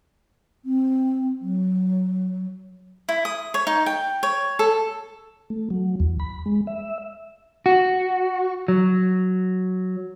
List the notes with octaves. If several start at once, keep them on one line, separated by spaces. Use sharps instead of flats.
C4
F#3
E4
D#6
C#5
D#4
G5
C#5
A4
A3
F#3
E2
B5
G#3
E5
F#4
F#3